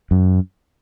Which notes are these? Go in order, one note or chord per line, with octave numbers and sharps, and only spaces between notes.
F#2